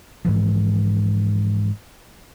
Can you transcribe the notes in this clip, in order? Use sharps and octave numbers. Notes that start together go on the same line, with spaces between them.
G#2 E3 F3